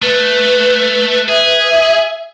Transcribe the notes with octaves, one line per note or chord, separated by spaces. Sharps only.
A3 B4
G#4 E5